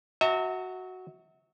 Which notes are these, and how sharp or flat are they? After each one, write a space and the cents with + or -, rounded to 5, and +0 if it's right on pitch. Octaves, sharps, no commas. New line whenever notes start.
F#4 +0 E5 -35 A#5 -45